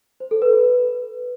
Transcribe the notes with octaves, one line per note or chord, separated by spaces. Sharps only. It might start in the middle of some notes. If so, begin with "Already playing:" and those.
C5
A4
B4
B4